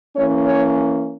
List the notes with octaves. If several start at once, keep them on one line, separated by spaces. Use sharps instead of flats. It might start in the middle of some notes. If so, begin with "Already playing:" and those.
E3 A#3 C#4 C#5
C#5